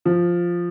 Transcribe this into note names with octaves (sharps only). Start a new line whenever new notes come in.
F3